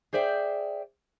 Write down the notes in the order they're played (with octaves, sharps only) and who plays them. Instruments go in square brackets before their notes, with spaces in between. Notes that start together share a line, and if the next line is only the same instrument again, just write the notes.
[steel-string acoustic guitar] G#4 C5 D5 E5 F5 G5